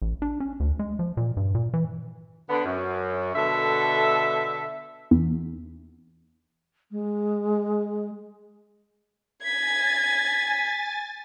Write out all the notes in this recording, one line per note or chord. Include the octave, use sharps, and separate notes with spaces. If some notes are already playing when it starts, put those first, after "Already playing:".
A1
D4
C#4
D2
G#3
F3
A#2
G2
A#2
E3
D3 B3
F#2
B2 D3 A4 E5
E2
G#3
G#5 G#6 A6 B6